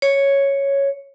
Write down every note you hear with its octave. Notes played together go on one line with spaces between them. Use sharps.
C#5